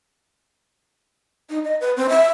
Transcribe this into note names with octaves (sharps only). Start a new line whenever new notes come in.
D#4
D#5
B4
C4
E5